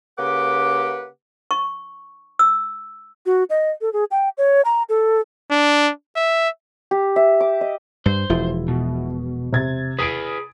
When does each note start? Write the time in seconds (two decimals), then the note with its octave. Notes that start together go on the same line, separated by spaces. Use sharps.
0.18 C#3 A#3 G4 B4 F#5 D6
1.51 C#6
2.39 E6
3.26 F#4
3.50 D#5
3.81 A4
3.93 G#4
4.11 G5
4.38 C#5
4.65 A#5
4.89 A4
5.51 D4
6.16 E5
6.91 G4
7.16 E5
7.40 D6
7.61 D#5
8.06 G2 C5
8.30 E1 F3 E4
8.68 B2
9.52 C3 G#6 A6
9.99 G#4 B4 D#6 D7